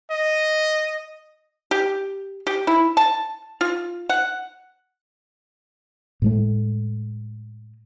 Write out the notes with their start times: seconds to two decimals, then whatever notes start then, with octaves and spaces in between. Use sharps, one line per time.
0.11 D#5
1.71 G4
2.47 G4
2.67 E4
2.97 A5
3.61 F4
4.09 F#5
6.22 A2 G#3 A3